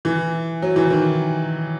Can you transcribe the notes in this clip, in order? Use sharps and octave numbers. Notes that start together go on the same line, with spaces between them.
E3
F#3
E3
D#3